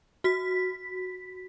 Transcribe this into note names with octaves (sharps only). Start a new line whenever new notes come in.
F#4 B6